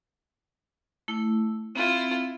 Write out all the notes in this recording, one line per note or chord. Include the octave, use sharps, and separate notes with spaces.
A3 E4
C4 E4 F4